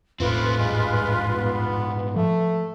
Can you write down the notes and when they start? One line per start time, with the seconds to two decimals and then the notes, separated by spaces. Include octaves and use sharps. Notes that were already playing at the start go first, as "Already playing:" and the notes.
0.20 E1 A1 A3 C4 F4 B4 C6
0.59 G#2 G3 G#3
1.35 B3
2.16 F3 A3